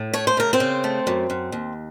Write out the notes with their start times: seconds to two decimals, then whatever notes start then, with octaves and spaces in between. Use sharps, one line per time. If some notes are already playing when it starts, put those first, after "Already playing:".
Already playing: A2
0.13 A3 C#5
0.27 C5
0.37 C#3 A#4
0.53 C4 C5
0.60 C#3
0.84 A3
1.07 F#2
1.30 F#2
1.52 D#2